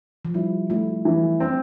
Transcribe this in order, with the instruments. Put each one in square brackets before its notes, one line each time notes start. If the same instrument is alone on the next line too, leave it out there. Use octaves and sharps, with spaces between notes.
[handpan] F3
[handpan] G3 [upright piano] E4
[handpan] A3 [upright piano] E4
[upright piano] E3
C4